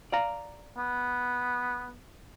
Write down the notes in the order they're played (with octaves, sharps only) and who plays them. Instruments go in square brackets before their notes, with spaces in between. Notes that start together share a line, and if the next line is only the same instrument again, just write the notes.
[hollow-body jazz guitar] D5 F5 A#5
[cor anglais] B3